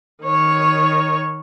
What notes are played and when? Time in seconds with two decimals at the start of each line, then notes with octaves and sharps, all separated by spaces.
0.24 D#3 C#5